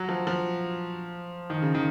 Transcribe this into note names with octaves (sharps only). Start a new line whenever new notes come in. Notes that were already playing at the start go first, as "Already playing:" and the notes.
Already playing: F#3
F3
F3
D#3
C#3
D#3